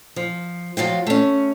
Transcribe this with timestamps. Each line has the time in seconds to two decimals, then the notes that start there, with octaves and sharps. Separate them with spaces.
0.16 F3
0.77 F3 F#3 F4 G5
1.07 A3 C#4